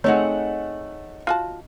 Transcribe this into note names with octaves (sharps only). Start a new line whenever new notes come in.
A3 C4 D#4 G#4 C#5 F#5
F4 F#4 A5